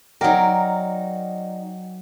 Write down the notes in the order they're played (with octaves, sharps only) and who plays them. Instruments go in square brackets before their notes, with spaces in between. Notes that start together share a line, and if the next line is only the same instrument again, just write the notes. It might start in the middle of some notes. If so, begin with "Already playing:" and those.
[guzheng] F#3 A#4 [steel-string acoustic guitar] D#4 D5 [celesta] F#5 G5